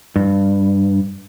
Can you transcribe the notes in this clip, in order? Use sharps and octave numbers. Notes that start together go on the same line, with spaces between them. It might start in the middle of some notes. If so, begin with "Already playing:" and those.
G2